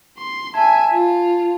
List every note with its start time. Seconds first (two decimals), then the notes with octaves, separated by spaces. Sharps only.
0.18 C6
0.54 E5 G#5 A5 G#6
0.93 F4